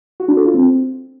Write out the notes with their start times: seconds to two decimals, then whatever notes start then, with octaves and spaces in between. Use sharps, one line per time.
0.20 F#4
0.28 D4
0.37 A4
0.45 F4
0.54 C4